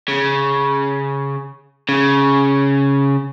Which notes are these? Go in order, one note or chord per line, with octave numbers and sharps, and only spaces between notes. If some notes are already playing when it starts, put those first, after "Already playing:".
C#3
C#3